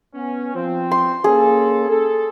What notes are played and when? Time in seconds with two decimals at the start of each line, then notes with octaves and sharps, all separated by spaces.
0.14 B3 C#4
0.55 F3 C4
0.91 C6
1.24 A#3 C#4 G#4 A4
1.89 A4